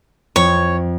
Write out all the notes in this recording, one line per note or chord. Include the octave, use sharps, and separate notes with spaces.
F2 C#5